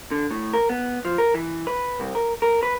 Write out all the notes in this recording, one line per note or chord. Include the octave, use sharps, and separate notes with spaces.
D3
A2
A#4
B3
F3
A#4
E3
B4
C2
A#4
A#4
B4